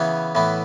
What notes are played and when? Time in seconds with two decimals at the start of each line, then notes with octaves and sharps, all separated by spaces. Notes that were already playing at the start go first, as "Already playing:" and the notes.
Already playing: C#3 E3 B3 C#5
0.35 A2 E3 B3